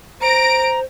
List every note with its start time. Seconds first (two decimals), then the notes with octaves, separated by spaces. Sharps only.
0.21 C5 A#5 A#6 D7